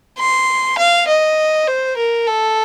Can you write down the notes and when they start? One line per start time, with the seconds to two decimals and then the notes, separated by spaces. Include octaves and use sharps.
0.19 C6
0.78 F5
1.09 D#5
1.67 C5
1.97 A#4
2.28 A4